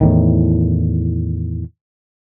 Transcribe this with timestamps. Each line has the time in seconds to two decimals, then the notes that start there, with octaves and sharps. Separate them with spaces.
0.01 E2 A2 D#3